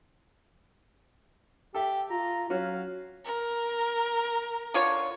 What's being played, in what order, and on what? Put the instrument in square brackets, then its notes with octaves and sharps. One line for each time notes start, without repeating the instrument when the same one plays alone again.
[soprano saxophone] G4 [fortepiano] A4 E5
[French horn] F4 [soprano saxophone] A#5
[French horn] F#3 [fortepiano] C#4 F#4 [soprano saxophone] F5
[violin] A#4
[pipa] D3 F4 C#5